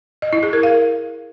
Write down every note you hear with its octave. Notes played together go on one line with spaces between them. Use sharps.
D#5
E4
G#4
A#4
F5